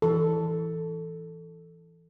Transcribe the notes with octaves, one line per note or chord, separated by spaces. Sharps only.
E3 A4